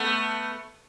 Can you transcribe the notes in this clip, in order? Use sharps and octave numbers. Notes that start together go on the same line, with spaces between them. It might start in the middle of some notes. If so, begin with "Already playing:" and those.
Already playing: A3 B3